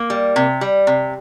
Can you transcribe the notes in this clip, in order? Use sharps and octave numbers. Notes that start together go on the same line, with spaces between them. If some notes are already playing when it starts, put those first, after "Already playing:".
Already playing: A#3
G3
C3
G3
C3